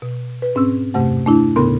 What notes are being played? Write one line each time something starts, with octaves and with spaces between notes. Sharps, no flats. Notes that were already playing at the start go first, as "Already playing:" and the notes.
B2
B4
G#2 C4 C#4 E6
E2 G2 C3 A3 F#5
A3 D4 E4
D#2 A2 C#3 B3 A#4 C6